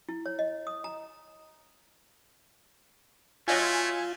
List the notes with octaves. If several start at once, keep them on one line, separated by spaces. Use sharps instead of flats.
E4
C#5
D#5
D#6
A#5
F#3 A3 F4 D#5 F5 G#5